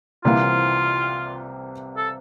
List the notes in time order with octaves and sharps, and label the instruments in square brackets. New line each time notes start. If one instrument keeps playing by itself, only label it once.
[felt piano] C2 C3 E3 G3 A#3 [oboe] F4
[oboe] A4